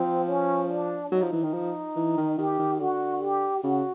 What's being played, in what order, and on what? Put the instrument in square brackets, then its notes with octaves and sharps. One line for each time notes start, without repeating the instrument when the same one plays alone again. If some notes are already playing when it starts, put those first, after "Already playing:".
Already playing: [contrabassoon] F3 [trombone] C4
[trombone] C#4
D4
[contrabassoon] F#3 [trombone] D#4
[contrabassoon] F3
E3
D#3
F3
E3
D#3
[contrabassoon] D#3 [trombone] G4
[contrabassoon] D#3
[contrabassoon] D3 [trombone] F#4
[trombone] G4
[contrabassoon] C#3 [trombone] F#4